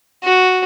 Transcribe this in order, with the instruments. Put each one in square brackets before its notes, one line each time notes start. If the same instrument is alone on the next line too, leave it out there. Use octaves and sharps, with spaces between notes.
[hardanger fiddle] F#4